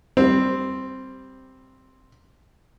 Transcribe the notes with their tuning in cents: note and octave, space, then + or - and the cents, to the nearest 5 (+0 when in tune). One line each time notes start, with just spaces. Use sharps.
G3 +0 C4 +0